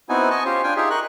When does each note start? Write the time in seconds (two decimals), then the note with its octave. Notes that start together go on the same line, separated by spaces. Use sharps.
0.09 B3 C4 D#4 E4 F#4 G#5
0.30 D#5 G#5 A5 C#6
0.45 C#4 F4 G4 C5
0.64 D4 F4 G5 G#5
0.76 D#4 F4 G4 G#4 E5
0.90 A#4 D#5 C#6 F#6